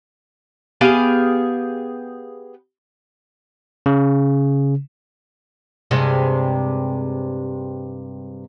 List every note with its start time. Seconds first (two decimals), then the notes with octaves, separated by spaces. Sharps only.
0.81 B3 G4 G#4 F5
3.86 C#3
5.91 G2 C3 G#3